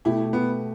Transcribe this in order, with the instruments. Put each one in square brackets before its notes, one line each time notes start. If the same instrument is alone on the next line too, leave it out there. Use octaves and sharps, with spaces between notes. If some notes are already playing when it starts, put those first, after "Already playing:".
[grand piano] B2 A3 G4 [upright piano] E4
[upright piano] B3